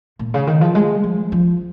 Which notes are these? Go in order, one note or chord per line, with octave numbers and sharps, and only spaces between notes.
A#2
C#3
D#3
F3
G#3
F3
F3